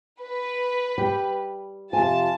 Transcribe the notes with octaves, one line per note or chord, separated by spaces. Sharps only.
B4
G3 G5
F2 C3 F4 G#5 A5